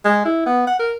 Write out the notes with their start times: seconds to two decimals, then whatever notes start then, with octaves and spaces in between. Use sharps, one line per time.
0.05 G#3
0.25 E4
0.46 B3
0.67 F#5
0.79 A#4